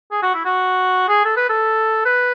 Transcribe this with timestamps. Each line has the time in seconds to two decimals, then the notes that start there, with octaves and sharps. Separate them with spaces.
0.11 G#4
0.22 F#4
0.34 E4
0.45 F#4
1.08 G#4
1.25 A4
1.36 B4
1.49 A4
2.05 B4